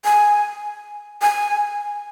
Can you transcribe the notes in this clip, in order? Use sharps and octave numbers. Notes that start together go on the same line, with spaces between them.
G#5
G#5